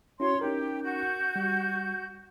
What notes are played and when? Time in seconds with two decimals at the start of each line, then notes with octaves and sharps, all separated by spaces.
0.20 C#4 E4 F#4 C#5 C6
0.41 C#4 D#4 G4 A#4
0.82 F#4 G6
1.36 G3